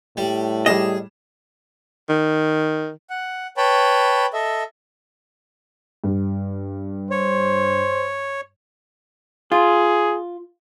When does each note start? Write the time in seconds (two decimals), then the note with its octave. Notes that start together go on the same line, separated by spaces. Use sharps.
0.17 A2 G3
0.66 G3 G#4 D#5 E7
2.09 D#3
3.10 F#5
3.57 B4 C#5 G5 A5 B5
4.33 A4 D#5 E5
6.04 G2
7.11 C5 C#5
9.52 F4 G#4